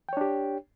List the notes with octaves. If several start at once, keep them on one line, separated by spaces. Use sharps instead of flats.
D4 G4 C#5 G5